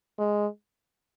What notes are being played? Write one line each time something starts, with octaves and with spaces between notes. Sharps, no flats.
G#3